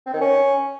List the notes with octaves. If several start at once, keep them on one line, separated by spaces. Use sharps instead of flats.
C4
D#3
C#4